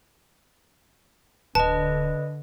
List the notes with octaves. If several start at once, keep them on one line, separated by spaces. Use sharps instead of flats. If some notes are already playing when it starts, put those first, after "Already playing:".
D1 D3 B4 D#5 A5